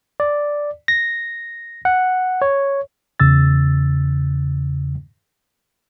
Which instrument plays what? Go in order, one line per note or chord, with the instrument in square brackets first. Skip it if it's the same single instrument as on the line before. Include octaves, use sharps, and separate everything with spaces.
[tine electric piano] D5
A#6
F#5
C#5
[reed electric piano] E2 C#3 E6 A6